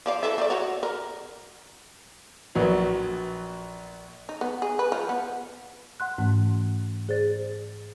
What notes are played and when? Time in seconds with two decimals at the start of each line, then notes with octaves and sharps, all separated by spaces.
0.06 F3 D5 F5
0.23 E3 A4 E5
0.38 A3 F4 D5
0.50 F#4 C#5
0.83 A#4
2.55 A#1 F#3 B3
4.29 D#4
4.41 B3
4.62 G#4
4.79 B4
4.92 F3
5.09 B3
6.00 F#5 C6 F#6
6.18 G#2 E3 A3 C#4
7.09 G#4 C5 D5 A6